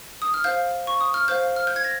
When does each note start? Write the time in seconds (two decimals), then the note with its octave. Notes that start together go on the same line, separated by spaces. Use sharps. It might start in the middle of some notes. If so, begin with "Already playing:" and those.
0.22 D#6
0.34 F6
0.44 C5 F5 G6
0.87 C#6
1.01 D#6
1.14 F6
1.28 C5 F5 G6
1.56 F6
1.67 G6
1.76 G#6
1.84 A#6